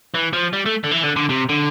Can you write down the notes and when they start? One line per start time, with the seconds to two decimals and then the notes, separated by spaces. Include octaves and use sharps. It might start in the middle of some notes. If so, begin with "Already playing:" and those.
0.14 E3
0.33 F3
0.53 G3
0.66 A3
0.84 D3
0.91 E3
1.03 D3
1.16 D3
1.30 C3
1.49 D3